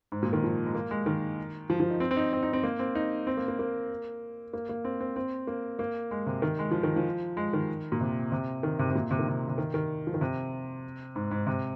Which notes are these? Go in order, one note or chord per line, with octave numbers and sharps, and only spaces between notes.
G#2
A#2
D#3
F3
G#3
A#3
G#3
D#3
F3
F3
D#4
C4
C4
D#4
C4
D#4
C4
A#3
C4
D#4
C4
A#3
A#3
A#3
A#3
A#3
C4
C4
C4
A#3
A#3
G#3
C3
D#3
G#3
F3
D#3
F3
G#3
D#3
A#2
C3
C3
D#3
C3
C3
A#2
C3
D#3
C3
C3
D#3
D#3
F3
D#3
C3
G#2
G#2
C3